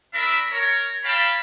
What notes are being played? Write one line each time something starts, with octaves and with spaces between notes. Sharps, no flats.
D4 A#4 E5 B5
A#4 C#5
C#5 F5 G5 A5 B5